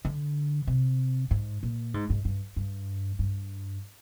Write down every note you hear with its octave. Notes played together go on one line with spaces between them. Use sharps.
D3
C3
G#2
A#2
G#2
G#2
G2
G2
G2